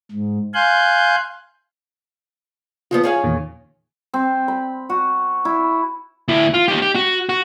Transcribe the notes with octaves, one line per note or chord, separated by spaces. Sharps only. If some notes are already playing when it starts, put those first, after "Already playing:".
G#2
F5 G#5 C6 F#6 G6
C#3 F3 B3 F4
C#4 G#4 F5
E2 A#2 D#3
C4
B5
F#4
E4
D2 E4
F4
D#4 G4
G4
F#4
F#4